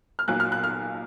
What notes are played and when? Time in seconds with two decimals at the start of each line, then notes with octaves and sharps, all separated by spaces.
0.19 F6
0.28 B1 A#2 F#3 F#6
0.40 F6
0.52 F#6
0.64 F6